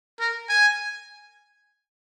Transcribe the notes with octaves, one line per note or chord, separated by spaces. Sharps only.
A#4
G#5